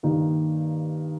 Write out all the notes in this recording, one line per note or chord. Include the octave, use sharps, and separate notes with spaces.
G2 D#3 A#3